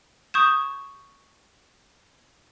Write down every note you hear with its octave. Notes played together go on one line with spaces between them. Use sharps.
C#6 D#6 G6 G#6 E7